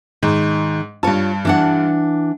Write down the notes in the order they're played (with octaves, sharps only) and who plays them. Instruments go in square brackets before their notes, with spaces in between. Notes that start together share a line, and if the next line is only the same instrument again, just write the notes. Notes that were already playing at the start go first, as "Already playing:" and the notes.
[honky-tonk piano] G#2 [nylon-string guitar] D#3
[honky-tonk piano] G2 A5 [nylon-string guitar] F4 C#5
[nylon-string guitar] E3 D4 F#5